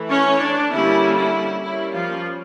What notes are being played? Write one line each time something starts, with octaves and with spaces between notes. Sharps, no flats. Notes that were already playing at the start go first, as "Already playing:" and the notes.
Already playing: E3 A3
C#4 C#5
D4
D3 G3 A#3 C#4 E4
E4
G3 A#3 C#4 E4
F3 F4